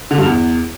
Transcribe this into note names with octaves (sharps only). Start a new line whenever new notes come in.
D3
G2
E2